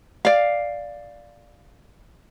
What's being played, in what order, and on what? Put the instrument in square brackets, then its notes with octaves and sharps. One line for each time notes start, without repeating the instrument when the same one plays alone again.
[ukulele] D5 F5